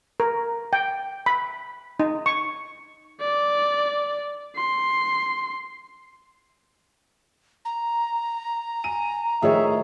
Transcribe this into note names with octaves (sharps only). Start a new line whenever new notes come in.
A#4
G5
B5
D#4
C#6
D5
C6
A#5
G#5 D#7
A2 D#3 F3 G#4 C#5 E5